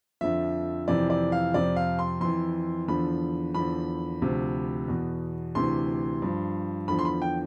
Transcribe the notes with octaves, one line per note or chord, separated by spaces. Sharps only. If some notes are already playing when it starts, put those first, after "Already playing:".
F2 D3 F3 E5
F2 C3 E3 D5
D5
F5
F2 C3 F3 D5
F5
C6
F2 E3 C6
E2 D3 F3 B5
E2 D3 F3 B5
D2 C3 F3
E2 B2
D2 C3 E3 C6
G2 F3
E2 D3 F3 B5
C6
B5
G5